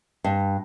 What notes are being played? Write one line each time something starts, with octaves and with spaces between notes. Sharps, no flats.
G2